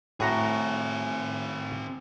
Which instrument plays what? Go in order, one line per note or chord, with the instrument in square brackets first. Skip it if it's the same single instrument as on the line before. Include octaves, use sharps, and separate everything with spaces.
[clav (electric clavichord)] A2 F#4 A#5 [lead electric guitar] C4 G#4